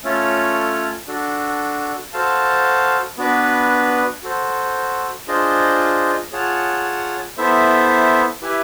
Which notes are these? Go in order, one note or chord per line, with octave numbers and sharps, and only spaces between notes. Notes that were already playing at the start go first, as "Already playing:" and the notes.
A3 C#4 F4 A4 C#5
D4 F#4 A4
F#4 A4 C5 F5 A5
B3 D4 F#4 B4
F#4 A4 C5
D4 F4 G#4 C5 D#5
F4 G#4 C#5 F#5 A5
B3 E4 A4 C5 E5
E4 G4 B4 E5 G#5